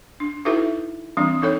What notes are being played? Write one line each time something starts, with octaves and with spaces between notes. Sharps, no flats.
D4
D#4 E4 F#4 A4 B4 E5
E3 G3 C4 D4
D#4 A4 C#5